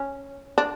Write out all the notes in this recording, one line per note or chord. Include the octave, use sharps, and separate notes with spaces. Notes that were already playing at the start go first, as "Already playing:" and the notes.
Already playing: C#4
D4